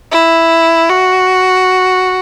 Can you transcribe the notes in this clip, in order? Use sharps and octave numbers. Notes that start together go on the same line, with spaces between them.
E4
F#4